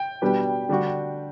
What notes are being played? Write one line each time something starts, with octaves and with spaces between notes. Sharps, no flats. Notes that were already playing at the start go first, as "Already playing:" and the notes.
Already playing: G5
B2 G3 D4 G4 B4
D3 G3 D4 F#4